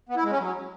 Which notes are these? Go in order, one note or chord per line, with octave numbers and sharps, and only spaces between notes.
B3
E4
G#3
C#4
F#3